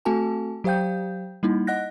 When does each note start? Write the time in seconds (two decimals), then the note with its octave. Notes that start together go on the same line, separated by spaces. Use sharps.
0.05 A3 C4 F#4 A4 G#5 A5
0.64 F#3 G4 C5 F5 G5 G6
1.43 G3 A#3 D#4 E4
1.67 D#5 F#5 F#6 A#6